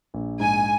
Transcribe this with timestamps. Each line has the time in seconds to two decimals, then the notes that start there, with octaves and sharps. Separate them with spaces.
0.14 A#1
0.40 G#2 G#5